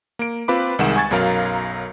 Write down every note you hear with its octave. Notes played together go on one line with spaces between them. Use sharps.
A#3 D7
C4 F4 B4 B5 D6
C2 D#3 G#3 F#5 E7
G#5 C#6 G#6 A6
B1 F#2 F#3 A#4 F5 A#5